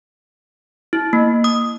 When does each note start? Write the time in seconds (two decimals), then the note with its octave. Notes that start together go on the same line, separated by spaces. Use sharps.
0.93 E4
1.13 A#3
1.44 D#6